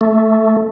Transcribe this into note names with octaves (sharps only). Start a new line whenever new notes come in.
A3